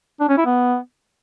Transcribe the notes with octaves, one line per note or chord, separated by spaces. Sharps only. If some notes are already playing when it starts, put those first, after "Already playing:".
D4
C#4
E4
B3